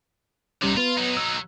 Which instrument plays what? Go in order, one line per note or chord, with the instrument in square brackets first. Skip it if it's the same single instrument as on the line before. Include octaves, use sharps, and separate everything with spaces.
[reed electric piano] C2 G3 C#4 [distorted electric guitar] C3 D#4
[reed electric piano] B3 B4 [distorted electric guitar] F4
[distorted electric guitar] F#3 D#4
[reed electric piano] E6